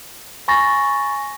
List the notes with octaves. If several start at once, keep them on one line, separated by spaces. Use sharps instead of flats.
G#5 B5 C#6 A6 A#6